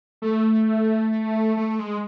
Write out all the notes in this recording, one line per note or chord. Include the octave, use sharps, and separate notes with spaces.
A3
A3
G#3